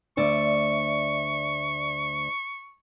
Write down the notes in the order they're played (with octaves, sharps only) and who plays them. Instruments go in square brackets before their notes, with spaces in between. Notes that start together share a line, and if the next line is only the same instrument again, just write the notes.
[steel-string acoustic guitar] D2 D5 E5 [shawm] C#6